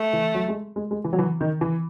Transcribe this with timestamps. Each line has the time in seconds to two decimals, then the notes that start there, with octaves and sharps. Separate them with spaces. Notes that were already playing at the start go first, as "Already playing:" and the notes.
Already playing: A3
0.13 E3
0.34 F#3
0.48 G#3
0.76 G#3
0.91 G#3
1.04 E3
1.13 F#3
1.19 E3
1.41 D#3
1.61 E3